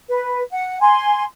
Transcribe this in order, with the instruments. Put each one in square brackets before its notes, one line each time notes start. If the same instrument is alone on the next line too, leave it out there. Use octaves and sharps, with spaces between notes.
[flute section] B4
F#5
G#5 C6